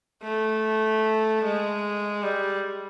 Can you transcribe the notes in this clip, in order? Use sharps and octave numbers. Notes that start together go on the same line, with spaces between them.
A3
G#3
G3